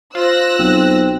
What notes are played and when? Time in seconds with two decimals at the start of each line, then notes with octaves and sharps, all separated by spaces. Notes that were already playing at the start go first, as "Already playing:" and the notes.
0.15 F4 C5 E6 F#6 A#6
0.59 B1 C4